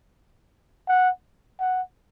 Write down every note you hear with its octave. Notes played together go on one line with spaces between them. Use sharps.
F#5
F#5